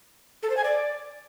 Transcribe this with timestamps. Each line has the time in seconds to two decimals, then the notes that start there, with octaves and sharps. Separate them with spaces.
0.43 A4
0.50 C5
0.57 G#5
0.64 D5